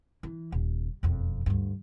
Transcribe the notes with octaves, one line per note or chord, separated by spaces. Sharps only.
E3
D#1
E1 F2
D2 G2